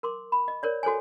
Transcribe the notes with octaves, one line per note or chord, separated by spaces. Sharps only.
A#4 C6 D6
B5
D#5
A#4 C#5 D5
F#4 A4 C5 C#5 G#5